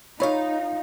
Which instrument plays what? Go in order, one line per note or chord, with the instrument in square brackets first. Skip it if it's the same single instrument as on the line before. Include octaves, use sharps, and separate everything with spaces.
[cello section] D#4 [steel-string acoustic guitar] F4 F5 [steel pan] C#5 B5